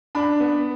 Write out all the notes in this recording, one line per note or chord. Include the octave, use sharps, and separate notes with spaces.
D4 B5
B3